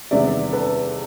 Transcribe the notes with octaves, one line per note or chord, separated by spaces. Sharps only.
E2 C3 D#3 G3 B3 D5 E5
A4 B4